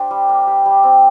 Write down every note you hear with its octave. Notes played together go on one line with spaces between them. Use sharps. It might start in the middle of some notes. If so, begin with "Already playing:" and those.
Already playing: D4 G4 C5
G3
A#3
G4
G3
C4